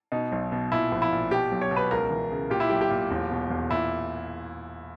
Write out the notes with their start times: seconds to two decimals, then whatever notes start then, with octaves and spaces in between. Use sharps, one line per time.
0.12 B2 D#4
0.32 B1
0.52 B2
0.72 A#2 E4
0.92 A#1
1.02 E4
1.12 A#2
1.31 B2 G4
1.52 B1
1.61 C#5
1.71 B2
1.76 B4
1.91 C#2 A#4
2.11 E3
2.31 C#3
2.50 A#2 G4
2.60 E4
2.69 B1 G4
2.81 G4
2.90 A#2
3.11 E1
3.31 B2
3.50 E2
3.71 A#2 E4